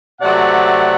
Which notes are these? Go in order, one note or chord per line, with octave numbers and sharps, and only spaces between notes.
C3 F#3 A3 C4 D5 F#5